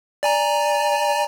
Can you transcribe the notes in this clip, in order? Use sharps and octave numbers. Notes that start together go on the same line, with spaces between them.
D5 G#5 A#5